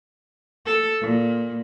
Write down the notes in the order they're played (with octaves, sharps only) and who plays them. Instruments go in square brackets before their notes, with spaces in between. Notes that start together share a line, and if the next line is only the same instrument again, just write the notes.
[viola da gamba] A4
A#2